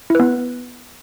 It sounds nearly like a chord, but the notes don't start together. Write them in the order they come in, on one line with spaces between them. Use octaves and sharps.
E4 B4 B3